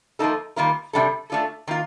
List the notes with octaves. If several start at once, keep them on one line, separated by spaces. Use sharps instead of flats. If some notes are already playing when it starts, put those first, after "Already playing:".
F3 A#3 D#4 A4
D#3 G3 A#3 F4 A#4
C3 G3 D4 A4
A3 D4 F4 A4
D#3 A#3 F4